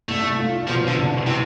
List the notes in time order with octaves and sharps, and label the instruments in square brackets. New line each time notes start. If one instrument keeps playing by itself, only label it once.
[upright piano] C2 [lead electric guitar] A3
[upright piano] F4
[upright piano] B2 [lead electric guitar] F3
[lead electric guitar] D3
[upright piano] C2
[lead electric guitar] C3 [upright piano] E3